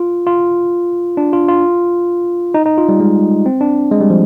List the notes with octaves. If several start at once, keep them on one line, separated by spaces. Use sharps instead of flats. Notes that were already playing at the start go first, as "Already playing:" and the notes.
Already playing: F4
F4
D4
F4
F4
D#4
D#4
F4
G3
G#3
C4
D4
G#3
G3
F3